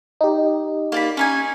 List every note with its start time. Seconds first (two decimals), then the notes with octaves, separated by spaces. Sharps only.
0.21 D#4 G4
0.92 A#3 D5 B5
1.17 C#4 D#4 G#5